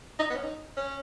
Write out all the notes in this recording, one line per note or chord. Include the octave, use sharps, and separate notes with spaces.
D#4
B3
C#4
D#4
C#4